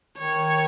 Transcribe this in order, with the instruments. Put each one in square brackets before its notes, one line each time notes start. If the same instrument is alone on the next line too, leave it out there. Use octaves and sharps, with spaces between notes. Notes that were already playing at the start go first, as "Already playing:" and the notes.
[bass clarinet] D#3 [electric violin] C#5